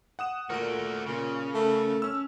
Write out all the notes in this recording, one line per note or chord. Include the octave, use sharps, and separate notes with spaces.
F#5 D#6 E7
A#2 A3 F#4 A#4 D7
A#2 C#3
A3
C#4 E6